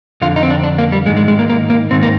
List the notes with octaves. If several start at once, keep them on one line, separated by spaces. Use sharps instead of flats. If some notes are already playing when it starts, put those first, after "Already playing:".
F2 D3 F4
D#4
C4
D4
D4
A#3
G3
G#2 D#3 G#3
G#3
G#3
A#3
A#3
A#3
G#2 D#3 C4
A#3